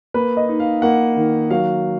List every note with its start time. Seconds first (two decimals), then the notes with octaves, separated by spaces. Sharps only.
0.14 A#3 B4
0.37 D#5
0.49 D#4
0.60 F5
0.82 A#3 F#5
1.16 D#3
1.51 F#3 F5